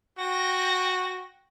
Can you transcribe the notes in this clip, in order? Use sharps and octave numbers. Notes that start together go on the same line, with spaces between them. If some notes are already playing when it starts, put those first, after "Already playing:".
F#4 G5 A#6